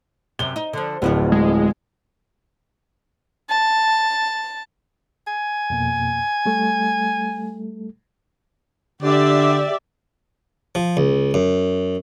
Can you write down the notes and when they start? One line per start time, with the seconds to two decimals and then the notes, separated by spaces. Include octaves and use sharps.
0.39 F#2 C3 G7
0.56 D#4
0.73 D3 F3
1.02 D1 F2 A2 B3
1.32 G#3
3.50 A5
5.27 G#5
5.70 F2 B2 A#3
6.46 G3 A3 A4
9.02 D3 G4 D5 E5
10.75 F3
10.97 C#2
11.34 F#2